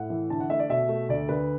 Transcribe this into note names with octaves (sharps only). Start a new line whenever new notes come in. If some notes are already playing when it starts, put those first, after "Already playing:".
Already playing: A2 F#5
E3
D3 A5
F#5
A3 E5
D5
B2 E5
A3
D2 D5
D2 B4